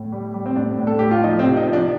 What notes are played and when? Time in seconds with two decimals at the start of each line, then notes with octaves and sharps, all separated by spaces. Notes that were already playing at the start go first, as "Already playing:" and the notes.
Already playing: A2
0.12 G3
0.34 G3
0.46 C4
0.56 A2 D4
0.78 A2
0.87 A4
0.99 A2 G4
1.11 F4
1.24 F3 D#4
1.39 C4
1.46 C3
1.57 D#4
1.67 F3
1.73 D4